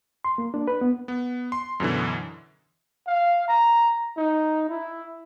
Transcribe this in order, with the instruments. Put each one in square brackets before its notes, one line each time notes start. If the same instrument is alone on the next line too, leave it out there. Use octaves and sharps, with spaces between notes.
[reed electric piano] C6
A#3
D4
B4
B3
[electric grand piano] B3
C6
F#2 B2 D3 E3
[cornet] F5
A#5
D#4
E4